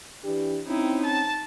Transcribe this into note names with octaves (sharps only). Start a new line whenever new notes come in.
E3 D4 G4
C4 C#4 D#4 E4
A5